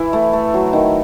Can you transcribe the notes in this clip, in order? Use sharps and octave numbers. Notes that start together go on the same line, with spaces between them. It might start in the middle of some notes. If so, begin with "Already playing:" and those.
Already playing: E3 E4
A3
A3
F#3
D#3